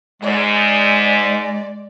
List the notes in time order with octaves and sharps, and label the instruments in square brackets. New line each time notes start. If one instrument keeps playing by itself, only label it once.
[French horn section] G#2 [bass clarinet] G#3 [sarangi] D5